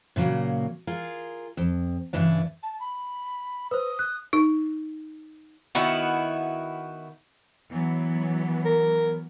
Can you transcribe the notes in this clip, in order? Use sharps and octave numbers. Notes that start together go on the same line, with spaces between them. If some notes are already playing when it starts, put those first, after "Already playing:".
A#2 C#3 F#3 A#3
F4 G#4 A#4
F2
G2 C#3 E3 D4
A5
B5
B4 C5 D#6
F#6
D#4
D#3 B3 E4 F#4
E3 F#3 B3
A#4